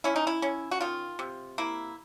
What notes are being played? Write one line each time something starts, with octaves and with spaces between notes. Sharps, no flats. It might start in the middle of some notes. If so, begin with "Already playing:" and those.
C#4 E4
D#4
E4
C#4
F#4
D#3 F4
C3
A#3 E4